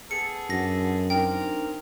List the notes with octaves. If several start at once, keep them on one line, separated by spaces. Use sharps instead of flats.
B3 G#4 A4 C#7
F#2 D4 F#5 A#6
C4 D4 D#4 A#4 G5